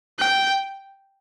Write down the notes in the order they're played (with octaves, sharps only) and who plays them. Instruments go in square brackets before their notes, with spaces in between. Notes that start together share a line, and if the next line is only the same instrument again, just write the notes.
[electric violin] G5